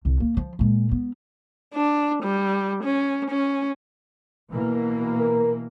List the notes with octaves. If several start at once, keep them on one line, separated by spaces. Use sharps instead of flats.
C2
A#3
F3
A#2 G#3
B3
D4
G3
C#4
C#4
B2 E3 A#3
A#4